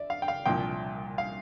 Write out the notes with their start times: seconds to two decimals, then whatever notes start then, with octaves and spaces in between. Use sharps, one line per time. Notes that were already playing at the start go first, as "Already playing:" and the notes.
Already playing: D5 E5
0.10 F5
0.22 G5
0.28 F5
0.46 C2 A#2 F3 G5
1.18 F5